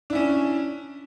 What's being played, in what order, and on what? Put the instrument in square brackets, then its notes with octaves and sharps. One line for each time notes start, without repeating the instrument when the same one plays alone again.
[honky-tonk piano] D4
E4
C#4